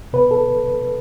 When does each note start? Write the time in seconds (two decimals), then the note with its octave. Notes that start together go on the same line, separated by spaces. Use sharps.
0.13 B2 B4
0.31 A4